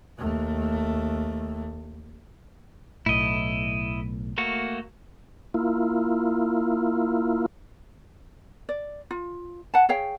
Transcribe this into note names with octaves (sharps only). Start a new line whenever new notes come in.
D#2 A3
B1 A2 E4 D#5
A3 A#3 F#4
A#3 E4 F4
D5
F4
F#5 A5
G#4 C#5 F5 G5